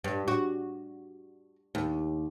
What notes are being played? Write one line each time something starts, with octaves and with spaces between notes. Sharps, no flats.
G2
F#4
D#2